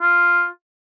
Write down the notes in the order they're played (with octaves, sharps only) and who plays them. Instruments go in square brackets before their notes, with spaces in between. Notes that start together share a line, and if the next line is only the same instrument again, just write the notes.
[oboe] F4